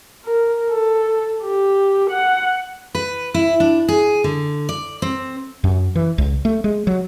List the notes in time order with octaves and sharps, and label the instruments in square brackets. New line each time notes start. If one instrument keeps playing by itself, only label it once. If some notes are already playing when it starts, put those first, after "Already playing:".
[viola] A#4
A4
G4
F#5
[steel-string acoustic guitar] B4
E4
D4
G#4
D3
D5
C4
[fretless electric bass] F#2
E3
C#2
A3
G#3
F#3